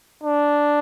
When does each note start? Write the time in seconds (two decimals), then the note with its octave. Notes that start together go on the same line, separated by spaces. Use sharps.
0.23 D4